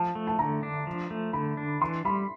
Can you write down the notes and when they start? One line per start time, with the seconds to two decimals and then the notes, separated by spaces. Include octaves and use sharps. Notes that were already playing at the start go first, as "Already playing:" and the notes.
Already playing: F3 A5
0.15 A3
0.27 A5
0.39 D3 A#5
0.63 D4
0.87 F3
1.11 A3
1.33 D3 B5
1.57 D4
1.81 E3 C6
2.05 G3 B5